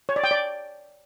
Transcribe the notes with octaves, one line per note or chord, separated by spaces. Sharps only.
C#5
D5
G5
D5